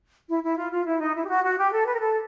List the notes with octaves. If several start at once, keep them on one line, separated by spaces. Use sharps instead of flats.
E4
E4
F4
F4
E4
D#4
E4
G4
F#4
F#4
G4
A4
B4
A#4
A4